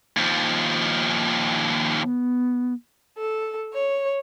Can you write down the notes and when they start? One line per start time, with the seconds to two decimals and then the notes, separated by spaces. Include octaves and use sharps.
0.17 D#2 F3
2.04 B3
3.18 A4
3.73 C#5